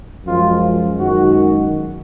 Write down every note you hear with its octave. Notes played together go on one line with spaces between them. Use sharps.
F#2 F3 G#3 F4
F#2 D#3 G#3 F#4